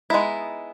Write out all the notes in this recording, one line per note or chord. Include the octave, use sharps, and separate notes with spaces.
G#3 B3 D#4 E4